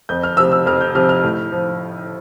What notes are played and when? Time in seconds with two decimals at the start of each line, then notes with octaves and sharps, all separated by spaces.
0.09 F2 G6
0.23 F6
0.37 C3 F3 E6
0.52 E6
0.66 F2 F6
0.81 G6
0.95 C3 F3 F6
1.09 F6
1.24 A2
1.52 F3